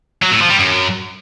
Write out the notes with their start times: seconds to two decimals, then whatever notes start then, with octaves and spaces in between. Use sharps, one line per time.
0.22 F#3
0.31 A2
0.41 F3
0.50 G3
0.59 F#2